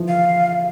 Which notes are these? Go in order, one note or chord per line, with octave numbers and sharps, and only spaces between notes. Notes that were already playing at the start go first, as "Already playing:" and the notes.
Already playing: E3 F3
F5